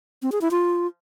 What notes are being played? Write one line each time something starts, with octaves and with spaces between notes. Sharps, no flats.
C4
G#4
E4
F4